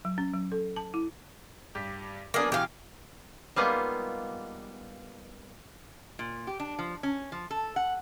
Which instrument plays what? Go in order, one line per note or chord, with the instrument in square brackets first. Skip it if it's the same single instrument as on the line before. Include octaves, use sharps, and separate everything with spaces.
[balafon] F#3
C#4
F#3
A4
A5
E4
[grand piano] G2 G4
[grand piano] F#3 B3 D4 [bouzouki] A#3 G#4
[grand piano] B2 E3 [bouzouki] G4 F5
[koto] G3 G#3 A#3 B3 D#4 F4
[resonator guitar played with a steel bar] A#2
G4
D4
F3
C#4
F3
A4
F#5